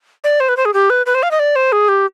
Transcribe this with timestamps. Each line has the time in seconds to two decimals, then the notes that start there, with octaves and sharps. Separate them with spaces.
0.24 D5
0.40 C5
0.49 B4
0.57 C5
0.65 G#4
0.74 G4
0.90 B4
1.06 B4
1.15 C5
1.23 F5
1.31 D#5
1.39 D5
1.56 C5
1.72 G#4
1.89 G4